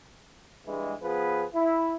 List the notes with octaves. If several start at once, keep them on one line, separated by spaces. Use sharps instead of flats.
G2 E3 G#3
F3 B3 G#4 B4
E4